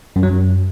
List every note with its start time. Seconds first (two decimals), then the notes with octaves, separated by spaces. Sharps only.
0.16 F#2
0.23 F#3
0.30 F#2